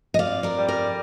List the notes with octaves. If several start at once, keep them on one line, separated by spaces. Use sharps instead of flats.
D#5
F2 D5 F5
A#4 D5
G3
A#4 D5